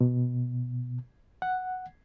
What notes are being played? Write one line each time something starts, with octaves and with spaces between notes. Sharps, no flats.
B2
F#5